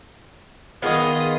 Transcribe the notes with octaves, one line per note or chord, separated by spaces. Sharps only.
D#3 B3 F4 G#4 D#5 F5